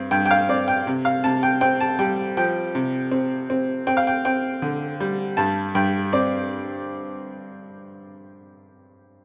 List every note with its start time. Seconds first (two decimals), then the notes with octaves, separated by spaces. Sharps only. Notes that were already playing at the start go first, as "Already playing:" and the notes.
Already playing: G2 C4
0.11 G2 G5
0.26 G5
0.31 F5
0.49 C4 D5
0.68 G5
0.87 C3
1.05 F5
1.24 C3 A5
1.43 G5
1.61 C4 G5
1.81 A5
1.99 G3 G5
2.37 F3 G5
2.75 C3
3.11 C4
3.50 C4
3.87 C4 G5
3.97 F5
4.07 G5
4.25 C4 G5
4.62 D3
5.00 G3
5.37 G2 A5
5.75 G2 G5
6.13 C4 D5